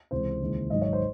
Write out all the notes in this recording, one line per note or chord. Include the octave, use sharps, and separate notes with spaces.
C#2 C3 E3 G#3 C5
D#2 C#3 E3 G#3
G#1 G#2 F#3 D#5
C#5
C5